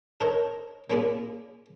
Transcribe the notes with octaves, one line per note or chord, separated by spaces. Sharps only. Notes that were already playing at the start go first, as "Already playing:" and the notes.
A4 A#4 C5 C#5 D#5
A#3 C#4 E4 F4 G#4 D5